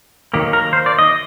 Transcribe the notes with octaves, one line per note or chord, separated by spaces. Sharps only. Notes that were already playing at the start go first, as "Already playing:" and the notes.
D#3 F#3 A#3 G4
A#4
C5
D5
D#5